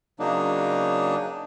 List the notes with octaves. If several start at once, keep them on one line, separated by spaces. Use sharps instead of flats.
C#3 F#3 A#3 D4 D#4